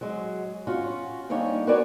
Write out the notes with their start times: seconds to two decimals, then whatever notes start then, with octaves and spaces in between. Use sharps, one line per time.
0.01 F#3 G#3
0.67 C#4 F4 F#4
1.29 D3 G3 A#3 D#4 C#5 G#5
1.67 F#4 A#4 B4 C#5 D5 G#5